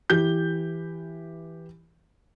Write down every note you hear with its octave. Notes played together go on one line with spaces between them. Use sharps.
E3 G4 G6